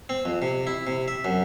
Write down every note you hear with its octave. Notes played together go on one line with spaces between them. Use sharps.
C4
F2
C3
E4
C3
E5
F#2